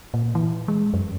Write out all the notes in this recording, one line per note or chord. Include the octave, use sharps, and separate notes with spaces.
A#2
E3
G#3
F#2